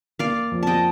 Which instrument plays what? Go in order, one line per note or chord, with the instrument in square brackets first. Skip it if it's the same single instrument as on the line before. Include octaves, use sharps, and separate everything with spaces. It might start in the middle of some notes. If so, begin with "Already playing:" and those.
[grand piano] A#3 [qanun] D5 F5
[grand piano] F2
[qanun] D#5 G5 A5